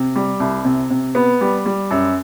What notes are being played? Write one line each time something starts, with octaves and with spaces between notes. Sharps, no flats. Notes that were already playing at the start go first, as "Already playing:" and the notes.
Already playing: C3
G3
C2
C3
C3
B3
G3
G3
F#2